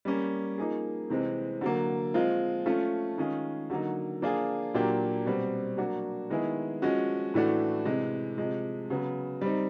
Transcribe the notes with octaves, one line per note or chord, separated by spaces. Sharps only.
G3 A#3 C#4
F3 A#3 D#4 G#4
C3 E3 G#3 C4
D3 F#3 A#3
F3 G#3 C4 F4
F3 A3 C#4 F4
D#3 G#3 C#4 F4 G#4
D3 F#3 A#3 D#4
F3 A#3 D4 F4 G#4
A#2 F#3 A#3 D4 G4
B2 G3 C4
F#3 A#3 D4 F#4
D#3 G#3 B3 E4 G#4
F3 G#3 C#4 F#4
A2 E3 A3 D4 F#4
C3 E3 G#3
C3 F3 G#3
C#3 F#3 B3
G3 C4 D#4